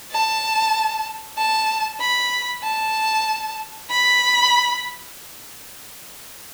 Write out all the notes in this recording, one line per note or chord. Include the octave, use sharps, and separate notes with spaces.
A5
A5
B5
A5
B5